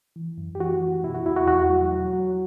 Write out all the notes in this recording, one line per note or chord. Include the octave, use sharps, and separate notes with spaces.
E3
F#2
G4
E3 F#4
E3
B2 E4
F#4
E2 E4
F#4
E2 F#4
F#3
F#3
F#3